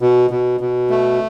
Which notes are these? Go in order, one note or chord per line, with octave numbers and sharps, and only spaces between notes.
B2
B2
B2
A3